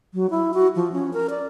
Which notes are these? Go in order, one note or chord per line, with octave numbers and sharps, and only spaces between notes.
F#3
E4
F#4
F3
C#4
A#4
D5